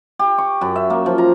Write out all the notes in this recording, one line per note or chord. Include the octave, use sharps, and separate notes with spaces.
G4
C#6
F#2
E5
A#3
F3
A#5